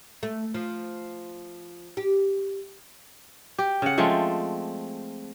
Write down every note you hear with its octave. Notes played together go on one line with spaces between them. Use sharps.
A3
F3
G4
G4
C#3 F#5
F3 G#3 A3 C4